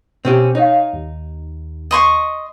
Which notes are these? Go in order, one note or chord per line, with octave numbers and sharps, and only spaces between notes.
B2 C4 C#4 G4
D#4 C#5 D#5 F5
D#2
D#5 C6 C#6